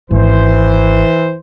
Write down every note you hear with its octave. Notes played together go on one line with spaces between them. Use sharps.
G#1 E3 C5